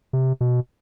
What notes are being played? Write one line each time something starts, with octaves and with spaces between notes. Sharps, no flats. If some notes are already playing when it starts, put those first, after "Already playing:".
C3
B2